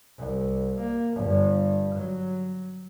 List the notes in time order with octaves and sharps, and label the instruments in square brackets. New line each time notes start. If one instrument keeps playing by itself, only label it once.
[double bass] C2
A#3
G1 G2
F#3